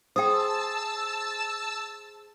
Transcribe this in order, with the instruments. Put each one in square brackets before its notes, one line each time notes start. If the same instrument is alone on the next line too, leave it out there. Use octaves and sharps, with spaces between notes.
[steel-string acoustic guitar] G#4 C5 [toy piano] G5 D#6 [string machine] A5 E6